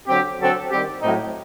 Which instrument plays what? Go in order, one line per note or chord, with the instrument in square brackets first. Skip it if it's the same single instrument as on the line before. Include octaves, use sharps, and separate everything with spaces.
[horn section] D3 F#3 C4 G4
D3 F#3 C4 F#4 A4
D#3 G3 C4 G4
A2 F#3 A3 C4 D#4